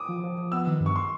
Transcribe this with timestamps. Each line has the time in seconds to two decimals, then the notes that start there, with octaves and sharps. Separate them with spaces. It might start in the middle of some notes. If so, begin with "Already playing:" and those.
Already playing: D6 D#6
0.09 F3
0.23 F3
0.38 F3
0.52 B3 E6
0.67 D#3
0.81 G2
0.86 C#6
0.96 C6